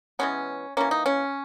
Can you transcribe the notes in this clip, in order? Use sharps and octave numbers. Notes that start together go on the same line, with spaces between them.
E3 G#3 B3 C#4
E3 A#3 C#4
D#4
C#4